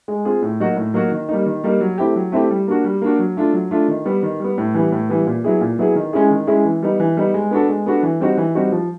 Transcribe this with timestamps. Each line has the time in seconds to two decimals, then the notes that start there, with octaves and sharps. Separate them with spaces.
0.08 G#3
0.25 C4 F4 G#4
0.42 A2
0.60 F#3 A#3 D#4 F#4
0.76 A2
0.94 F#3 A#3 D#4 F#4
1.12 D#3
1.29 G3 A#3 D#4
1.46 D#3
1.64 G3 A#3 D#4
1.81 F#3
1.98 A3 C4 E4 G4
2.16 F#3
2.32 A3 C4 E4 G4
2.50 G3
2.68 A#3 D4 F#4
2.84 G3
3.02 A#3 D4 F#4
3.19 F#3
3.37 A3 D4 F4
3.53 F#3
3.71 A3 D4 F4
3.88 D#3
4.05 G3 B3
4.23 D#3
4.40 G3 B3
4.58 A2
4.75 E3 G3 B3
4.92 A2
5.09 E3 G3 B3
5.27 A#2
5.44 F#3 B3 E4 G#4
5.61 A#2
5.79 F#3 B3 E4 G#4
5.95 D#3
6.13 G#3 C#4 E4 G#4
6.31 D#3
6.47 G#3 C#4 E4 G#4
6.65 E3
6.82 G3 B3 D#4
7.00 E3
7.17 G3 B3 D#4
7.34 G#3
7.51 B3 D4 F#4 A4
7.68 G#3
7.86 B3 D4 F#4 A4
8.03 E3
8.20 G3 C4 D#4 F#4
8.37 E3
8.55 G3 C4 D#4 F#4
8.72 F3